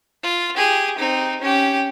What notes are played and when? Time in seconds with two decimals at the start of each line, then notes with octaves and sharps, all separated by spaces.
0.23 F4
0.56 G4 G#4
0.98 C4 D#4
1.41 C#4 G4